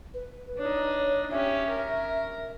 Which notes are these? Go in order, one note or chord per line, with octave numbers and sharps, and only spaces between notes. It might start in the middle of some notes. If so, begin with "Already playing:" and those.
B4
D4 D#4 C#5
C#4 G4 E5
A#4